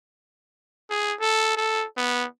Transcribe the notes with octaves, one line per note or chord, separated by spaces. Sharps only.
G#4
A4
A4
B3